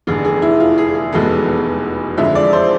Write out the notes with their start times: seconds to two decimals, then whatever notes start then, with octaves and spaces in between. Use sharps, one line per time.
0.07 F1 E2 D3 G#4
0.25 G#4
0.42 E4
0.60 F4
0.78 G#4
0.95 G#4
1.12 F1 E2 B2 G#3 B3 A4
2.17 F2 D3 F3 G#3 E5
2.35 D5
2.53 C5